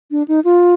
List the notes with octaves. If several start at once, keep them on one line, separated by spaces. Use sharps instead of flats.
D4
D#4
F4